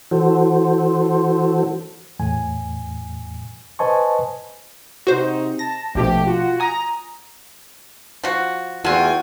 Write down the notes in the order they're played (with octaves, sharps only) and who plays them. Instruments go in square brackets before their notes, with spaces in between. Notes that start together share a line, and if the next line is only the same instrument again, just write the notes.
[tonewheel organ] E3 F#4 A4 C5
[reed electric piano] E2 A2 G#5
B4 C5 D#5 G#5 A5 C#6
[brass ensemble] C3 D#4 [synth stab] F#4 C5
[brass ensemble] A5 [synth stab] A#6
[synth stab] A#1 B2 F3 [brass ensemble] A3 G4
[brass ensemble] F4 F#4
[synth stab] G#5 D#6 [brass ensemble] A#5
[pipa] F3 F#4
[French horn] E2 [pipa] A3 F4 [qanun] F#4 [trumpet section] G5 G#5